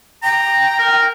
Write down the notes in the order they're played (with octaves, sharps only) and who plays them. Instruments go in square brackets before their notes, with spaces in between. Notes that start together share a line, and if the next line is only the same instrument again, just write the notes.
[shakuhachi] G5 [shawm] A#5
[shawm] A#4